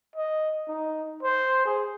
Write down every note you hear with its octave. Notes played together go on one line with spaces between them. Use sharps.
D#5
D#4
C5
G#4